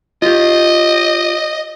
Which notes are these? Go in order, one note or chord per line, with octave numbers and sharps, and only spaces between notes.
F4 G4 D#5